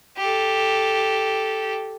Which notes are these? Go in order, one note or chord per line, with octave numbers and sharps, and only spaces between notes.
G4 A4